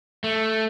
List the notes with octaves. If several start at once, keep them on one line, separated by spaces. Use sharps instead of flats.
A3